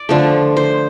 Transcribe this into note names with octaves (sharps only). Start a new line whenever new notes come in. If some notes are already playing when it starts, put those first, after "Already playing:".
Already playing: D5
D3 F3 A3
C5